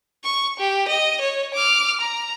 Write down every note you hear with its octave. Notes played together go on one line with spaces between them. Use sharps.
C#6
G4
D#5
C#5
D6 F6
A#5